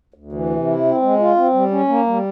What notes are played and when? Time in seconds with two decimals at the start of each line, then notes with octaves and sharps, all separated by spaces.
0.14 D2
0.32 E3
0.49 C3
0.66 E4
0.85 C4
1.02 G#3
1.19 F4
1.36 C4
1.54 G3
1.71 C#4
1.88 A#3
2.06 G3